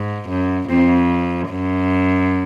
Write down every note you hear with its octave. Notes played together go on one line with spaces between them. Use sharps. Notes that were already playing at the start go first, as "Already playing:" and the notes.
Already playing: G#2
F#2
F2 C4
F#2